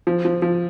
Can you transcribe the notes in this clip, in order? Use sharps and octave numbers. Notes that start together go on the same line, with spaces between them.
F3
F3
F3